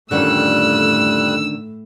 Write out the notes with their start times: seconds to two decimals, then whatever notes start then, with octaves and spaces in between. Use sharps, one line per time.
0.11 F2 A2 D3 D#3 G3 C#4 E6 F#6